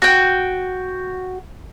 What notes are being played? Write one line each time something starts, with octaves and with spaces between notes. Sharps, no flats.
F#4 G5